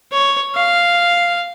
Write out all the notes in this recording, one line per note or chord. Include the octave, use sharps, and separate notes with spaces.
C#5
F5